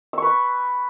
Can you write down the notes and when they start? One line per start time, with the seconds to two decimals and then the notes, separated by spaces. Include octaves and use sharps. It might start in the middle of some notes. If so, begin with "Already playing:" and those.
0.13 E6
0.18 C#6
0.22 B4
0.27 B5